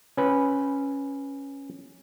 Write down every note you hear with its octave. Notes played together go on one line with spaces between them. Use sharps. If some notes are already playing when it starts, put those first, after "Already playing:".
C#4 B4